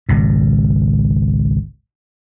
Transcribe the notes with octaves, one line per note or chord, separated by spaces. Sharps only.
G#1 C#2 B2